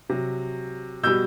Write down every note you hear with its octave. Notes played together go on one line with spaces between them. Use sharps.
C3 F#3
B2 G3 E6 G6